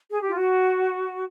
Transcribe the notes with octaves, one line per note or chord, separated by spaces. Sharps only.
G#4
G4
F4
F#4